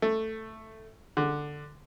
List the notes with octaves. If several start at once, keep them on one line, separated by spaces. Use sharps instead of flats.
A3
D3